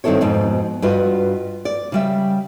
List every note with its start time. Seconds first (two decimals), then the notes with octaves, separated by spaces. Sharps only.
0.04 G2 D#3 C4 E4 A4 C#5
0.21 F2 G#2 B2
0.82 G2 F4 F#4 B4 D#5
1.65 D5
1.92 C#3 G3 E5